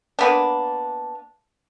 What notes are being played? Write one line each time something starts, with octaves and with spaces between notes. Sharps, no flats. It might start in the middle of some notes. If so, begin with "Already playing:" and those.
A#3 B3 D4